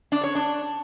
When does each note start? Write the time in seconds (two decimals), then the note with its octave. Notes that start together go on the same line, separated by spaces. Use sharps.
0.12 D4
0.24 C#5
0.35 D4